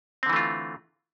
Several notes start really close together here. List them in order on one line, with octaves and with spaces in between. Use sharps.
C4 D3 E3 A3 F4